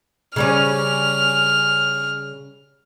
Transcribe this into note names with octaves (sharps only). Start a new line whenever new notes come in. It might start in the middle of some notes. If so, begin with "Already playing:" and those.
C#3 G3 C#4 F6